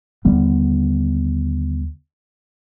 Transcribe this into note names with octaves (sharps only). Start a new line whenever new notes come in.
D#2 D3 G3 B3